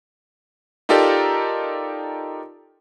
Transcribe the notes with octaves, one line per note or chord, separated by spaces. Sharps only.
D#4 F4 G4 A4 A#4 D5